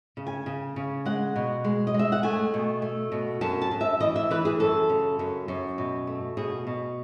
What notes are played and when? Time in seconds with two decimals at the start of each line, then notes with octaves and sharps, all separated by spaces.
0.17 C#3
0.27 G#5
0.46 C#3
0.76 C#3
1.05 G#3 F#5
1.36 B2
1.64 G#3
1.87 D#5
1.94 G#3 E5
2.12 F#5
2.23 A3 G#5
2.54 B2
2.82 A3
3.12 B2
3.41 F#2 A5
3.62 A5
3.71 F#2
3.81 E5
4.00 E3 D#5
4.16 E5
4.31 E3 B4
4.45 G#4
4.60 F#2 A4
4.89 C#3
5.19 F#2
5.48 F#2
5.78 B2
6.07 A3
6.37 B2 G#4
6.67 B2